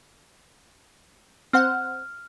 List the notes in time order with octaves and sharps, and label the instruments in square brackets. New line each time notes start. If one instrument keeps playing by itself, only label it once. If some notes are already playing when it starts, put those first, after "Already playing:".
[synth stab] C4 C5 F#5 [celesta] F6